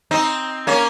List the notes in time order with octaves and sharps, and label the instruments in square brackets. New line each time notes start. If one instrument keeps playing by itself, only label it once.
[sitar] C4 D#4
A#3 C#4